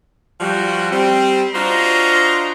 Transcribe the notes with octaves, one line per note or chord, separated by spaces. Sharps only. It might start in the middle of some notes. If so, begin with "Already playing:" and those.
F3 G3 F#4
G3 C4
D4 F4 F#4 C5 D#5 A#5